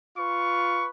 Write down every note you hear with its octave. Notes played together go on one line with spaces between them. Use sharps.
F4 B4 C#6